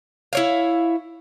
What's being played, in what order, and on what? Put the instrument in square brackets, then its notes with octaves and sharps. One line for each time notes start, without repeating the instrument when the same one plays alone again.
[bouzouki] E4 C#5 F5